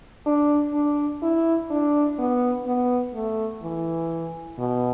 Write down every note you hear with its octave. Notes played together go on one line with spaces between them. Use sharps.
D4
D4
E4
D4
B3
B3
A3
E3
B2